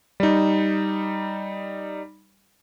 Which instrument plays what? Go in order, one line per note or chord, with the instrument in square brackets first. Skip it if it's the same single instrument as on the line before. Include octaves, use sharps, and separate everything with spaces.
[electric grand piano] G3 D#4